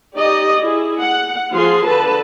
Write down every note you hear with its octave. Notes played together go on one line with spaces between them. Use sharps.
D#4 G4 D5 D#5
E4 G#4
F#5
F3 F4 G#4 C6
D3 A4 B4 A5